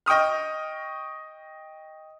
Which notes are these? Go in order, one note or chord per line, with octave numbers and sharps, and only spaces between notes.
D#5 G5 C#6 D#6 F6